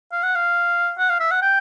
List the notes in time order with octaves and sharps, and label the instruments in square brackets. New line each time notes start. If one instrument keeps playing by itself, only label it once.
[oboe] F5
F#5
F5
F#5
F5
E5
F#5
G5